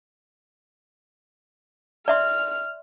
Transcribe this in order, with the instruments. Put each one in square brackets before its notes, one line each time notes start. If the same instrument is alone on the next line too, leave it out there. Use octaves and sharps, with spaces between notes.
[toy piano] D5 E5 C6 [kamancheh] F6